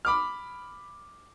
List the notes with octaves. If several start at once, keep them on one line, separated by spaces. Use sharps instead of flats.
B5 D6 F6